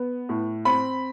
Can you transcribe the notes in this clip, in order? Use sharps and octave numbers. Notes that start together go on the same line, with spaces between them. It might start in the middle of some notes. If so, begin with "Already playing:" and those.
Already playing: B3
A2
C4 B5